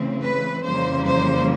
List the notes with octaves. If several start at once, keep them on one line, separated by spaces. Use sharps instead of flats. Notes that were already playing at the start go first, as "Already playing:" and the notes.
Already playing: C#3 E3 A3 C4
B4
F2 C#3 E3 G3 A#3 C5
C5